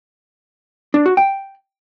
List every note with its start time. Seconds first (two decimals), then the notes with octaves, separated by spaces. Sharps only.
0.94 D4
1.06 F#4
1.17 G5